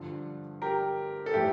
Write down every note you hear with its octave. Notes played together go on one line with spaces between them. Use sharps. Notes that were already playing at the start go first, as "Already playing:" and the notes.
Already playing: G2 D3 F3
G4 A#4
A4
A2 E3 G3 E4 G4